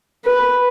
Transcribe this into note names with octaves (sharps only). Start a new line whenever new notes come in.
B4